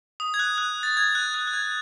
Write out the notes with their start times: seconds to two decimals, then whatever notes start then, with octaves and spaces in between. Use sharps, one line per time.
0.20 D#6
0.34 G#6
0.39 F#6
0.58 F#6
0.83 A6
0.97 G#6
1.15 F#6
1.34 F#6
1.47 F#6
1.53 G#6